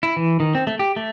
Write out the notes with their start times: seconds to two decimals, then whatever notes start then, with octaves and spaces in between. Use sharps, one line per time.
0.03 E4
0.16 E3
0.40 D#3
0.55 C4
0.67 A3
0.79 G4
0.96 A3